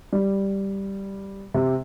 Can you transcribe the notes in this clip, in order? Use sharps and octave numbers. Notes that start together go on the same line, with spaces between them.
G3
C3